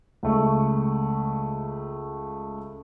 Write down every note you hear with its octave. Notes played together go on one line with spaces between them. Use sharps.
C#2 A3 C#6